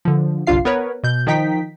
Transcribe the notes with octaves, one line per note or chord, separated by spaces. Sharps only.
D3 F3
G1 C2 D4 F4 F5 C7
B3 A#4 B4 C#5
B2 G6
D#3 F3 D#4 G5 B6